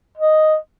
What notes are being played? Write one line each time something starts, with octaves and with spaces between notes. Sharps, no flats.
D#5